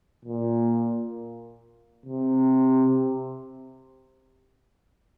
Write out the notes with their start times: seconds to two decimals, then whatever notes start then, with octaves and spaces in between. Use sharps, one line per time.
0.25 A#2
2.06 C3